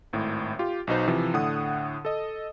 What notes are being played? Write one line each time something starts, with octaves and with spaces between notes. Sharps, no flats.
G#1 A2
F4 G4
B1 B2 D#4 C5
C3 E3 F3
A2 D3 F#5 D#6
A4 D#5